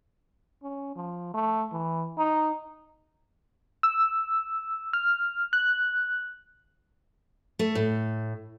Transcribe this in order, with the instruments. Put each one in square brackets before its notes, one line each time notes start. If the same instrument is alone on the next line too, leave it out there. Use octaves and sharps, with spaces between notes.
[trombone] C#4
F3
A3
E3
D#4
[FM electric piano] E6
F6
F#6
[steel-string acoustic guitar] A3
A2